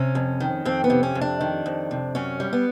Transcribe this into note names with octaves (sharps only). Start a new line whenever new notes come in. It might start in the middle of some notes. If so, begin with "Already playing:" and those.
Already playing: C3 C#4
F2
D#3
F2 C4
B3
C3
C#4
F2
D4
D#3
F2
C3
F#2 C#4
G3
B3